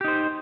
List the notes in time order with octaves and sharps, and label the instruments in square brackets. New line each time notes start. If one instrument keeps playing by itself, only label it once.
[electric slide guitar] G4
D#4
C5